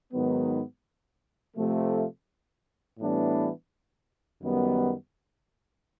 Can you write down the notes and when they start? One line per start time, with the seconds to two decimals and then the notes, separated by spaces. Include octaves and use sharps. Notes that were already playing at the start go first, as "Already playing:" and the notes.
0.13 G#2 D#3 F#3 B3
1.56 C3 F3 A3
2.99 A2 E3 G3 B3 D4
4.42 F#2 D#3 G3 B3